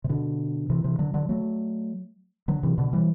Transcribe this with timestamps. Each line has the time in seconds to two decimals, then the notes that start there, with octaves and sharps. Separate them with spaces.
0.04 C3
0.09 B2 D3
0.70 C3 E3
0.84 C3 E3
0.99 D3 F#3
1.14 D3 F#3
1.29 F#3 A3
2.48 D3 F#3
2.63 C3 E3
2.78 B2 D3
2.93 E3 G3